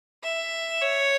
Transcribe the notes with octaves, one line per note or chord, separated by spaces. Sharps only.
E5
C#5